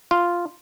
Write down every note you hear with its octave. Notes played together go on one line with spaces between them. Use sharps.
F4